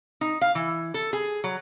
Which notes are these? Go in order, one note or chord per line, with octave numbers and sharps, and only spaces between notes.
D#4
F5
E3
A4
G#4
F#3